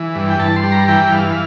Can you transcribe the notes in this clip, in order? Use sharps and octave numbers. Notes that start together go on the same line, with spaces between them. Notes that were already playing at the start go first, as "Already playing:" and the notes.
Already playing: E3
G2
G5
G2 A5
C6
G3
A#5
E3 G5
G2 F5